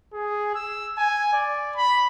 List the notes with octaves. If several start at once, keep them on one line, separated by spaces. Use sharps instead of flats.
G#4
E6
G#5
D5
B5